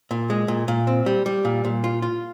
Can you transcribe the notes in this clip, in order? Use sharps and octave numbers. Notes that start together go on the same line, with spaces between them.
A#2
G#3
A#2
A#2
C4
G3
G3
A#2
A#2
F4
F4